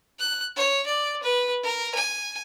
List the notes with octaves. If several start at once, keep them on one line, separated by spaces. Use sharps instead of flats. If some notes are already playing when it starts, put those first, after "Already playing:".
F#6
C#5
D5
B4
A#4
G#5